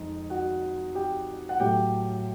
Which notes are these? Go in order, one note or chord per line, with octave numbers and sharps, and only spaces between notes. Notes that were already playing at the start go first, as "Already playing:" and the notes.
Already playing: F2 G#3 D#4
F#4 F#5
G4 G5
F#5
A2 F#3 A3 G4 G5